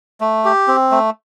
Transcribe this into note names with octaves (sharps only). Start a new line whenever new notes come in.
A3
G4
C4
A3